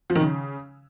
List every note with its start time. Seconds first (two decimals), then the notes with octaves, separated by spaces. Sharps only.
0.10 F3
0.15 D#3
0.21 C#3